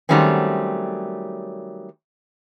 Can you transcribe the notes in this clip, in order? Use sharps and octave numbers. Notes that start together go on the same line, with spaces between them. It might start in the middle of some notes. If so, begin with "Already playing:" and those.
D#3 F#3 G3 A3 C4 C#4